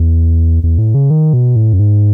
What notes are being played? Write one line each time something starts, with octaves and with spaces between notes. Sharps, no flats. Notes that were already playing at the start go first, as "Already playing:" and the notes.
Already playing: E2
E2
A2
C#3
D#3
B2
A2
F#2
G#2